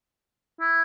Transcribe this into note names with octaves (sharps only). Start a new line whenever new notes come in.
E4